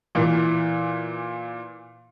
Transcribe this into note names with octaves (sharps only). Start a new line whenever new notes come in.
A#2 E3